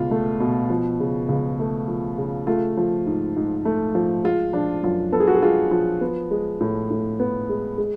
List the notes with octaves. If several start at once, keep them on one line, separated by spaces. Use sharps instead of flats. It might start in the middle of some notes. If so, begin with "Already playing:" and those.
Already playing: C#2 B2 F4
A3
B2
F3
C#3
C#2
A3
F3
C#3
A3 F4
F3
G#2
G#2
A3
F3
G#3 F4
F3 D4
F#2 F4
B3 A4
G#4
F#4
G#4
G#3 F4
F3 F4
B3
G#3
A2
A2
B3
G#3
G#3